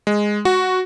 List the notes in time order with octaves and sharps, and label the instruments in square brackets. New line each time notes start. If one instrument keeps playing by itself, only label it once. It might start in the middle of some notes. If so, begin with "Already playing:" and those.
[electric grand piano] G#3
F#4